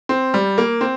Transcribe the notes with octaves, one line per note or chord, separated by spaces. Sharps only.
C4
G3
A#3
C4